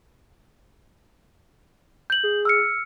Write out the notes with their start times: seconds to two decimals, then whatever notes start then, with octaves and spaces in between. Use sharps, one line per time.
2.10 G6 F#7
2.23 G#4
2.45 E6 F6 C#7